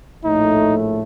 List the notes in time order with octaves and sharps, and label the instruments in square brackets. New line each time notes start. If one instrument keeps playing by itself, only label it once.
[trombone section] A#1 A2 A3 [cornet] D#4